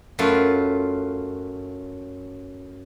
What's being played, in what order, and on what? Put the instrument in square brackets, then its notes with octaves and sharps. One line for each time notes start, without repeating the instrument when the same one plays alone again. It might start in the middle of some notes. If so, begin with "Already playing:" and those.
[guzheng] F#2 A3 F4 B4